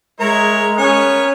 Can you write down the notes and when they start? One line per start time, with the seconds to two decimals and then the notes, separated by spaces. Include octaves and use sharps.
0.20 G#3 E4 A#4 C#5 A#5
0.78 B3 C#4 C#5